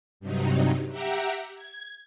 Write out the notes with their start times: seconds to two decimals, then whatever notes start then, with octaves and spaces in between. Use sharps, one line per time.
0.20 G2 C3 F#3 D#4
0.90 G4 E5 F#5 G5 A#5
1.55 G#6